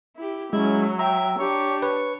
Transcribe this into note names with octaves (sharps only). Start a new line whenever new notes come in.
E4 G4
F#3 G#3 C#4 E4
E5 G5 A#5
D4 G4 C#5
B4 C#5